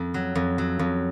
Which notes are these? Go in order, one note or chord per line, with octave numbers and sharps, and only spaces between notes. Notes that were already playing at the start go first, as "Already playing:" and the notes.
Already playing: F2
F#3
F2
F#3
F2